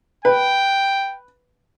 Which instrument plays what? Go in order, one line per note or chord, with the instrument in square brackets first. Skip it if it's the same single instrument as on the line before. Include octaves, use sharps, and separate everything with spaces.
[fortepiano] B4 [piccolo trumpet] G5